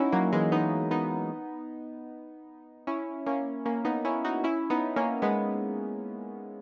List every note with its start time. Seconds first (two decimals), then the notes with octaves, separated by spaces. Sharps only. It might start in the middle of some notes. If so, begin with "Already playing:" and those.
Already playing: C#4 D#4 E4 F#4
0.12 F#3 A#3
0.32 E3 G#3
0.52 B3 D#4
0.91 B3 D#4
2.87 C#4 E4
3.26 A#3 C#4
3.65 A#3 C#4
3.85 B3 D#4
4.05 C#4 E4
4.25 D#4 F#4
4.44 C#4 E4
4.70 B3 D#4
4.96 A#3 C#4
5.22 G#3 B3